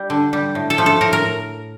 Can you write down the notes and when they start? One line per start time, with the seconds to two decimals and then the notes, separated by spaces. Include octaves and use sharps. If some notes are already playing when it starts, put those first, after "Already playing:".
Already playing: G3
0.10 D3
0.33 G3
0.55 A2
0.70 A4
0.78 F3 A3
0.86 A4
1.01 A2 A#4
1.13 A#4